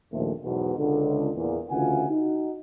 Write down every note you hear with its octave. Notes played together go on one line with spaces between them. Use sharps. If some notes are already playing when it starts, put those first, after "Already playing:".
A#1 D#2 C3 A3
B1 E2 G#2 B2
C#2 D3
E2 A#2
D2 C#3 E3 F4 F#5 G#5
D#4 F#4